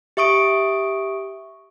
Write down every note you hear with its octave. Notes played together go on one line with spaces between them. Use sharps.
G4 E5 C#6 D#6 D7